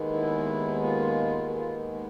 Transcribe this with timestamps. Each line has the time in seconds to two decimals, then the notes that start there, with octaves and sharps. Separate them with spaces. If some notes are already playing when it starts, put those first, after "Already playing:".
Already playing: D#2 D#3 G#3 B3
0.12 E4
0.83 F4
1.49 F#4
1.55 F4